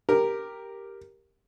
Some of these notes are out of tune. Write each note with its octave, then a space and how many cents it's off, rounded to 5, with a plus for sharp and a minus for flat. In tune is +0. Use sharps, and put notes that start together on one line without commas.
G4 +0 A#4 +0